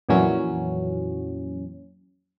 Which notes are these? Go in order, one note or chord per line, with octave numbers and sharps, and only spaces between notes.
F2 A#2 E3 F#3 C#4